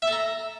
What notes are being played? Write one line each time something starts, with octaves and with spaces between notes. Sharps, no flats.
E5
A4
A#5